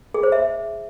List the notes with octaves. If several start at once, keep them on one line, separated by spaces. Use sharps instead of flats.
G#4
C5
E5